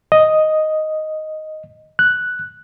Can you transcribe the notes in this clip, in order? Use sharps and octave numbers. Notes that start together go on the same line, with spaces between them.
D#5
F#6